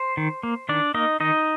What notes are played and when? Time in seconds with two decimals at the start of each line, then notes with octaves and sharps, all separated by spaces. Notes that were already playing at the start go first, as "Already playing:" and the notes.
Already playing: C5
0.17 D#3
0.43 A#3
0.69 D#3 D4 D5
0.94 A#3 D#4 D#5
1.20 D#3 D#4 D#5